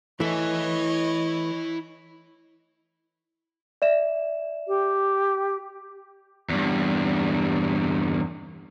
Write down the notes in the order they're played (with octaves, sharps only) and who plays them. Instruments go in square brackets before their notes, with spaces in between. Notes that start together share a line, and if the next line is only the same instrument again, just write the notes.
[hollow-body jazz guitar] E3 A3 [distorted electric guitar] E4 G#5 [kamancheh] C#5 D#5
[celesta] D5 E5 E7
[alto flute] G4
[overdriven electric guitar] E2 G2